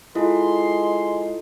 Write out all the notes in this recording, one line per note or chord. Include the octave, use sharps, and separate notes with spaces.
G#3 E4 F4 A4 C6